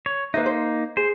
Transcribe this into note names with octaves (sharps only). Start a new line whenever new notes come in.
C#5
A#3 D#4 B4 C5 E5
C5
G#4 C5